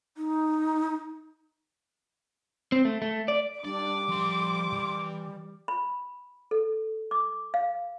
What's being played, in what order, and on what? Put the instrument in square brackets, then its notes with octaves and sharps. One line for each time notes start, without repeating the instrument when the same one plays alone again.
[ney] D#4
[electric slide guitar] C4
A3
A3
D5
[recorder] G3 [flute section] D4 [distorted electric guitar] D5 [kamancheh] D6
[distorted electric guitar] F3 B5 [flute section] C6
[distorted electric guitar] E3
[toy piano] B5
A4
D6
F5